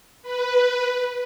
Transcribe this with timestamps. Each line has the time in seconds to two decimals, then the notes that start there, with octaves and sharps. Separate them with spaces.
0.22 B4